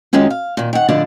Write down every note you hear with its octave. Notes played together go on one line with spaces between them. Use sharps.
F#2 D#3 G#3 C#4 F4
F5
A#2 D#3
D#3 F#5
A2 D3 F3 D5 D#5